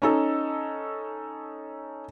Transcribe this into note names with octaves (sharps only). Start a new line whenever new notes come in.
C#4 D#4 A4